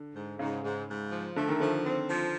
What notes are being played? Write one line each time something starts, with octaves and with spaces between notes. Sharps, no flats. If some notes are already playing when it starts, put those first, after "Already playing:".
Already playing: D3
G#2
G#2 C#3
G#2
G#2
F3
D3 A3
D#3
D3 F3
C4
F3